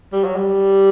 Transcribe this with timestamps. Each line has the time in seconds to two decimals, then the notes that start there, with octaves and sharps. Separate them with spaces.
0.13 G3
0.24 F#3
0.36 G3